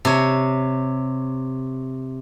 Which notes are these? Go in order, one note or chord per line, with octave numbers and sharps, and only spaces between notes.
C3 C#5